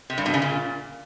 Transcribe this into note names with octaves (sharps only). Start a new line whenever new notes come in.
C3
G2
B2
C#3
A#2